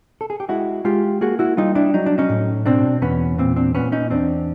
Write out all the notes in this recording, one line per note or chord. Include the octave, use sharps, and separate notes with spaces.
A4
G#4
G4
G#3 E4 F#4
G#3 F4 G4
A#3 F#4 G#4
E4 F#4
G3 D#4 F4
D4 E4
F#3 D#4
D4
C#4 D#4
A2
B2 C4 D4
E2 B3 C#4
A#2 C4
C4 D4
A#2 B3 C#4
C#4 D#4
E2 C4 D4